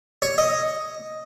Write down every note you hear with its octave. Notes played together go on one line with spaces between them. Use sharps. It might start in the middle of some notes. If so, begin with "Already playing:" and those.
C#5
D#5